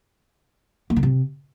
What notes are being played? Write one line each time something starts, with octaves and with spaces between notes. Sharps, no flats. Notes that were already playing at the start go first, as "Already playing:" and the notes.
A#3
D3
C3